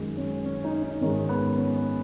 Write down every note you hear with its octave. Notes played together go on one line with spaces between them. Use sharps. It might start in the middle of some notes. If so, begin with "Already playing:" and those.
Already playing: F#2 D#3 G#3
C#4
C#4
D#4
D#4
G#2 D#3 G#3 C#4
B3
C#4